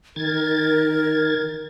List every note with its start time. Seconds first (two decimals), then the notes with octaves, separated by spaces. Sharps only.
0.16 D#3 A#4 G#6 A6